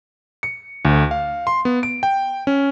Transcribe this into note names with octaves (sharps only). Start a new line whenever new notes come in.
C#7
D2
F5
C6
B3
D7
G5
C#4